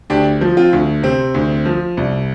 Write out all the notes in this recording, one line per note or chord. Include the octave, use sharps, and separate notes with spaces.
D2 D4 G4
F3
C4 F4
D2
C3 C4
D2
F3
C2